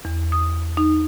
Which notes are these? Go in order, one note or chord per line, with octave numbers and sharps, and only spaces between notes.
E2
D#6
D#4